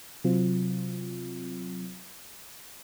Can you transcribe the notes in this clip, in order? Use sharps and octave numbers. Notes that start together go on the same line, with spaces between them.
C3 F#3 C4 F4